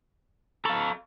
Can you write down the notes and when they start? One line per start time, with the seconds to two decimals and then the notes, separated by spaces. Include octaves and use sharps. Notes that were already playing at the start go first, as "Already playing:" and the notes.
0.65 A4 F5 A#5 B5 C#6